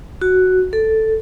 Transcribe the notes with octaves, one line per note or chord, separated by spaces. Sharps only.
F#4
A4